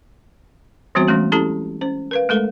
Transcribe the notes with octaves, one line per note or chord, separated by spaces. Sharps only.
E3 G3 B3 C4 F#4 C5
E3 G#3 A3 C#4
C#4 E4 G4 A4 A5 A#5
C#4 C5
A#4 B4 F5
G#3 A3 A4 A#4